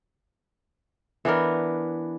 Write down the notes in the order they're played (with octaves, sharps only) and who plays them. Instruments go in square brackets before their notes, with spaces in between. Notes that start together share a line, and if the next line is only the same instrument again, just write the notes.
[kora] E3 B3 D4 A#4